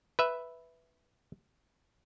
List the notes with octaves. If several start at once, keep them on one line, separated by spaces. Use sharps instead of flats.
B4 E5